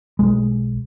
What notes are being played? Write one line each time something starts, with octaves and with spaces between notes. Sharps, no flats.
B1 G#3